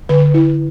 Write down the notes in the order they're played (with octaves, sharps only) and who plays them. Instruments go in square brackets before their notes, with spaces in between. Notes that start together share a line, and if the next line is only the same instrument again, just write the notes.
[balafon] D3 B4
E4